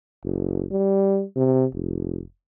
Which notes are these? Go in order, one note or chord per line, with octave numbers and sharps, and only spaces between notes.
F#1
G3
C3
F1